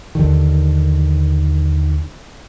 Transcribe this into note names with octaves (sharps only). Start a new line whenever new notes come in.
D#2 D3 D#3